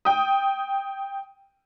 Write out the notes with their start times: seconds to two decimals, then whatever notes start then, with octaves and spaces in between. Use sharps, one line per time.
0.05 G5 D#6